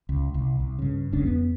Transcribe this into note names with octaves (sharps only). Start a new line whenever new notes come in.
C#2
C2
C2
G2 C#3
E1 B1 C#3 D4
F2 B3